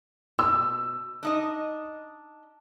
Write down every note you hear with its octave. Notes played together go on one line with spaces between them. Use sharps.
B2 E6
D4 D#4 D#5